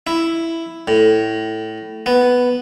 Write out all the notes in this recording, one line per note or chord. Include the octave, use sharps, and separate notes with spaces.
E4
A2
B3